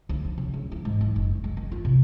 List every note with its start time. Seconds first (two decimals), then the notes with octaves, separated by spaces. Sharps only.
0.09 D2
0.25 F3
0.38 C#3
0.54 C#2
0.72 E3
0.85 G#2
1.01 D#3
1.16 F#1
1.44 G#3
1.57 D#3
1.72 F4
1.85 C3